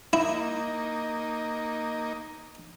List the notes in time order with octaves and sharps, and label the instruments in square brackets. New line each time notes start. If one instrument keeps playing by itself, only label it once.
[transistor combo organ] A#3 D#4 [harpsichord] E4